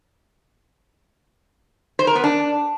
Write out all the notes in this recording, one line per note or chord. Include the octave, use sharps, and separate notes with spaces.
C5
A#4
B3
D4